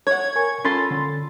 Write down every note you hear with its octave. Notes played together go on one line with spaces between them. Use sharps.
C#5 F#5 G#6
A#4 G#5 C#6
C#4 F4 A4 B5 C6 A6
D3